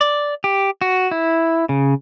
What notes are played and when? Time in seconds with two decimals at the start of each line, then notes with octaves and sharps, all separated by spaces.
0.01 D5
0.44 G4
0.81 F#4
1.11 E4
1.69 C#3